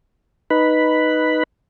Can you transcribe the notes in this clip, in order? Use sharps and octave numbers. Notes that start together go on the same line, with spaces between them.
D#4 B4 B5